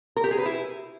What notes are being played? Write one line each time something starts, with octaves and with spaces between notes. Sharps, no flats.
A#4
G4
G#4
B4
E4